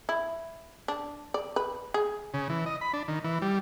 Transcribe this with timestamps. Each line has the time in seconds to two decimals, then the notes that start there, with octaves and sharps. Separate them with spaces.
0.09 E4
0.88 D4
1.34 D5
1.56 B4
1.94 G#4
2.34 C#3
2.50 E3
2.66 D#5
2.81 B5
2.93 D4
3.08 D#3
3.24 E3
3.42 G3